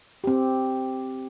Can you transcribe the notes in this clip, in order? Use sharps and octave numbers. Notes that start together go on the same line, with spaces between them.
C4 G4